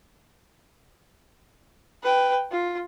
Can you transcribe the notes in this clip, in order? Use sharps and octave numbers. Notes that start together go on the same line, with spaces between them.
B4 G5
F4